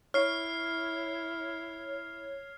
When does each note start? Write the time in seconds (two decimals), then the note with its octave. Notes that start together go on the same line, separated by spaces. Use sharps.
0.14 E4 C#5 F6 C7